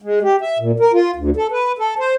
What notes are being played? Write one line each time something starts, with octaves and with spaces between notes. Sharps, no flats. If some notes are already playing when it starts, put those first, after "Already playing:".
G#3
G4
E5
A#2
A#4
F4
D2
A4
B4
A4
C5